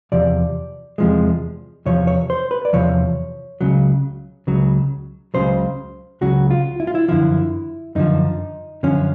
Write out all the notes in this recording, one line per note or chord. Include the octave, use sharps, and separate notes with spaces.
E2 C3 F3 D5
E2 C3 F3 G#3
E2 C3 F3 C#5
C#5
C5
B4
D5
E2 C3 F3 C#5
C#2 C#3 F#3
C#2 C#3 F#3
C#2 C#3 F#3 C5
C#2 C#3 F#3 F#4
F4
E4
F4
E4
F#2 D3 F3 E4
F#2 D3 F3 D#4
F#2 D3 F3 C#4